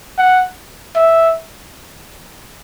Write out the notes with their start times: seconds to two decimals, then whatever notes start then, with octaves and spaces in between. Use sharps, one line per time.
0.18 F#5
0.95 E5